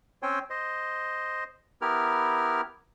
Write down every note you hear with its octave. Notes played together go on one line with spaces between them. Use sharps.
C4 C#4 C5 C#5 G5 G#5
C5 D#5
B3 E4 G4 A#4 F6